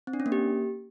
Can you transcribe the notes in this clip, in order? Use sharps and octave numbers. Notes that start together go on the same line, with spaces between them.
C4
D4
C#4
A#3
G4